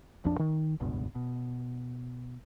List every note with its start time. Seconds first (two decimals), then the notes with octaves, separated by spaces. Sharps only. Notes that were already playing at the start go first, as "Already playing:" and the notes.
0.24 A#1 F2 F3 D4
0.39 D#3
0.80 F1 C#2 G2 B2
1.15 B2